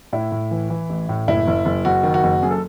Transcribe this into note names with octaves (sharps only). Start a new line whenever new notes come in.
A2 E4
A2
E3
E3
A1
A2
F#1 E4
F#1
F#1
F#1 F#4
D#3
F#4
F#1
F#2 G#4
A4